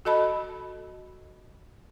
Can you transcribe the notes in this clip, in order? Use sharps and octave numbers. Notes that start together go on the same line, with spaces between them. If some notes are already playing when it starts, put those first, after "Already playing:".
F#4 A4 D#5 A5 B5